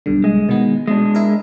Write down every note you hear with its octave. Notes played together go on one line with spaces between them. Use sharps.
B1 G2 D3
G#3
B2 D#3 B3
B2 G#3 D4
E4 A#4